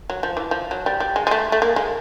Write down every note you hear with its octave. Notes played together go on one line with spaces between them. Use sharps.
F#3
F3
E3
F3
F#3
G3
G3
G#3
G#3
A3
A3
A#3
G#3